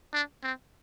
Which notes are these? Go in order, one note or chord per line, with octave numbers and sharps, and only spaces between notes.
D4
C4